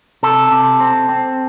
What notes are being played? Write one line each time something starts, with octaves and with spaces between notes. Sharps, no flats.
C3 A4
C3
C4
C4